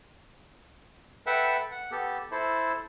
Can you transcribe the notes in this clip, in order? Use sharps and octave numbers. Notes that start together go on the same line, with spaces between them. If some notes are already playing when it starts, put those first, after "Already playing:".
A4 B4 E5 F#5 G5 A5
F#5
B3 G4 A4
E4 A4 C5